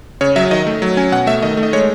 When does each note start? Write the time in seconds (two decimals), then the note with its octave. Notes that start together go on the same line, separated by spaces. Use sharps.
0.21 C#3 C#5
0.36 F#3 E5
0.51 D#3 D#5
0.67 A3
0.82 F#3
0.97 C#4 G#5
1.12 B2 F#5
1.27 A3 E5
1.43 D#3 D#5
1.57 A3
1.63 D#5
1.73 G#3 C#5